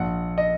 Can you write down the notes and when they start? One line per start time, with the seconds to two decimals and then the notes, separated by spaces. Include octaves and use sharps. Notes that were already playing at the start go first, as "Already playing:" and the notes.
Already playing: A#1 F#5
0.38 D#5